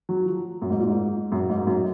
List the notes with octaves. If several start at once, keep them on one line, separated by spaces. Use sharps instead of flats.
F#3
F3
F#2
G#2
A#2
G#2
F#2
G#2
F#2